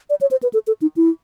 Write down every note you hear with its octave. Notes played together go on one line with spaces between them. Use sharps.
D5
C#5
C5
B4
A4
A4
D#4
E4